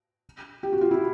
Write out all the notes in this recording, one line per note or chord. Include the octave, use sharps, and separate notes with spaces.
G4
F#4
F4
E4